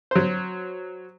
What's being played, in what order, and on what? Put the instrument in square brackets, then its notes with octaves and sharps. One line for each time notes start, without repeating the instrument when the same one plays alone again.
[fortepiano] F#3 C5